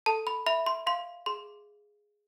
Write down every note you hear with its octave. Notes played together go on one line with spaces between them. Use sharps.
A4 A5
B5
E5 B5
C6
F5 C6
G#4 C6